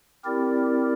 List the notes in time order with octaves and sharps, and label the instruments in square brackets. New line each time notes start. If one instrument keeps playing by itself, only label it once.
[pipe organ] C4 E4 G4 A#4 D5